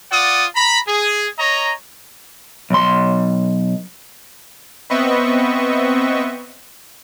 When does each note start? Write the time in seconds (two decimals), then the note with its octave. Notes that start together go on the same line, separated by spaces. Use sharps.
0.11 F4 D5 F#5 D#6
0.55 A#5 B5
0.87 G#4
1.38 C#5 D#5 A#5
2.70 B1 C6
4.90 B3 C4 B4 D#5 E5 C#6